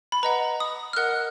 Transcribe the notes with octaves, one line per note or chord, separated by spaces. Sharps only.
B5
B4 D#5 F#5 A#5
D#6
F6
A#4 D#5 F#5 F#6